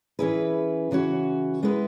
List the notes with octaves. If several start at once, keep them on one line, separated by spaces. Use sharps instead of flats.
E3 C#4 E4 G#4 B4
C#3 E3 C#4 F#4
G#3 B3 E4 B4